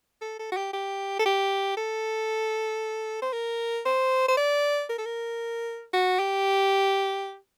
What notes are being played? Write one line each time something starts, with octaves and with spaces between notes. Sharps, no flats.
A4
A4
F#4
G4
G4
A4
G4
A4
C5
A#4
C5
C5
D5
A#4
A4
A#4
F#4
G4